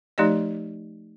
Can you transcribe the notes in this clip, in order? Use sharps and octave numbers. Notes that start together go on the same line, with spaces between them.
F3 A3 D#4 G4 D5 D#5